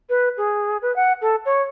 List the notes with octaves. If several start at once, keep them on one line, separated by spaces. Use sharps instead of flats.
B4
G#4
B4
F#5
A4
C#5